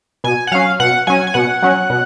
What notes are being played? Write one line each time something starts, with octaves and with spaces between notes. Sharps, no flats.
B2 G#5
F#5
F#3 C#4 F5
B2 F#5
F#3 C#4 G#5
G#5
B2 F#5
F#3 C#4
B2